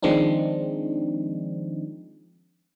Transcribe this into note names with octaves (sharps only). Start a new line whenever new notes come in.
D#3 F3 G#3 C4 D4 D#4